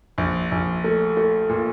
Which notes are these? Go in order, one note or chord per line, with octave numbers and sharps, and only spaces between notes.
A#1
A#1
A3
A3
A#2